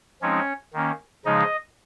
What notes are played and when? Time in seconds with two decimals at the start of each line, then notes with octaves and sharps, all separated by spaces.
0.22 F3 G#3 C4 C#4 D#4 C#5
0.73 D#3 A#3 C#4
1.25 C#3 F3 G#3 D#4 D#5